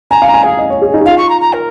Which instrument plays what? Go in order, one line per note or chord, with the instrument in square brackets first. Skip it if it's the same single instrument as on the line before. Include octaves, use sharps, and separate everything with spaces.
[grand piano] G#5 [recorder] A#5
[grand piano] F5
[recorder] A#5
[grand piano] G#5
[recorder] G#4 [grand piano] F5
[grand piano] D#5
C#5
G#4
D#4
G#4
[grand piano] F4 [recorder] F5
[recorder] C#6
A#5
A#5
A#4